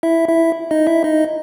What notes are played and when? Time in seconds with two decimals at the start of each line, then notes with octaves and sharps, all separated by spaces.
0.03 E4 E5
0.29 E4 E5
0.71 D#4 D#5
0.87 E4 E5
1.04 D#4 D#5